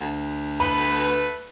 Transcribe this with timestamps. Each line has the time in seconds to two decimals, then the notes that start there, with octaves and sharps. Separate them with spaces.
0.01 D2
0.60 A3 B3 B4 B5